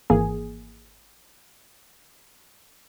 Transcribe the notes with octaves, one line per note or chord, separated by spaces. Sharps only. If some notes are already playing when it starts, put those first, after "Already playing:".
G#1 E3 A#3 G#4